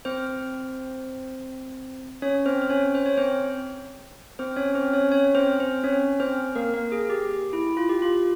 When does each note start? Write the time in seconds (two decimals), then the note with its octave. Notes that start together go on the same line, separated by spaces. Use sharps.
0.05 C4 C5
2.22 C#4 C#5
2.46 C4 C5
2.62 C5
2.70 C#4 C#5
2.95 C5
3.06 C#5
3.17 C4 C5
4.39 C4 C5
4.56 C#4 C#5
4.75 C4 C5
4.93 C#4 C#5
5.12 C#4 C#5
5.35 C4 C5
5.60 C4 C5
5.84 C#4 C#5
6.20 C4 C5
6.55 A#3 A#4
6.74 A#3 A#4
6.92 G#4
7.10 G4
7.53 E4
7.77 F4
7.89 G4
8.02 F4